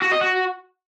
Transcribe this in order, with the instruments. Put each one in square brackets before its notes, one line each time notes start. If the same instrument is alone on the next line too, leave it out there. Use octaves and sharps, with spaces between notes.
[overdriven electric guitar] F#4
D#5
F#4